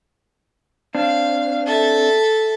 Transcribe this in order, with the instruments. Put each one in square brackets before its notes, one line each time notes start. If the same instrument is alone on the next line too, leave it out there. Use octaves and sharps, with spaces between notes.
[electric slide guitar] C4 D4 [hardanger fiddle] F5
[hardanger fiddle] A4 E5